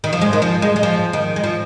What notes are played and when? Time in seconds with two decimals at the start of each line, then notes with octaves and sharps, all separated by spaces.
0.04 D#3
0.13 F3
0.21 G#3
0.33 D#3
0.42 F3
0.62 G#3
0.76 G#3
0.83 F3
1.13 D#3
1.36 G#3
1.44 F3